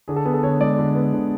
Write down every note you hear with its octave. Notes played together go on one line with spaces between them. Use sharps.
D3 G#4
A4
B3 G#4
A4
D3 C#5
G#3 D5
D3
B3
D3